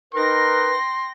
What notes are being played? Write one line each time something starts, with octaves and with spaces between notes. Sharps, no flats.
D#4 A#4 B4 G5 C6 A#6